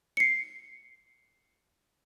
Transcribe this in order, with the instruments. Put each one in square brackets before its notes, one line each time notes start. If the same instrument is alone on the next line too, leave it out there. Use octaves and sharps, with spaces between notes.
[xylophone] C7 C#7